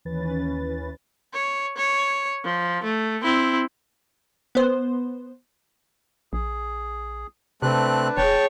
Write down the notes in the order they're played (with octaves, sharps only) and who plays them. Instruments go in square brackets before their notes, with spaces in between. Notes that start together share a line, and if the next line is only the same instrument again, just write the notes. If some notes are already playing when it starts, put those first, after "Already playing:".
[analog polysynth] D#2 E3 C#4 B4 A6
[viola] C#5
C#5
F3
A3
C4 E4
[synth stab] B3 C5
[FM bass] A#1 [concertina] G#4
[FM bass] C3 [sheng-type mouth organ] A3 C4 F#6 [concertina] D4 B4
[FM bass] E1 [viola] G#4 C#5 [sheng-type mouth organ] G5 A5